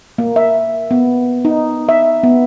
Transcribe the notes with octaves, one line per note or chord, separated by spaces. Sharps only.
A#3
E5
B3
D#4
E5
B3